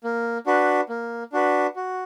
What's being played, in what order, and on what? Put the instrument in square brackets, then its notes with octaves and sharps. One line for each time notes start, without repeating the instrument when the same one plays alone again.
[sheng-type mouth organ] A#3
D4 F#4 B4
A#3
D4 F#4 B4
F#4